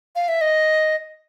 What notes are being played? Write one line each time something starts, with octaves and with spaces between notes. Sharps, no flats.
F5
E5
D#5